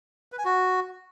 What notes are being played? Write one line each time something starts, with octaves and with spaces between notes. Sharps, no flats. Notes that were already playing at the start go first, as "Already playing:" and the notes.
B4
G#5
F#4